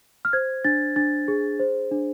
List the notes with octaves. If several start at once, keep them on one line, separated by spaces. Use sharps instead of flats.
F6
C5 G#6
D4 A6
D4 A6
G#4
C5
D4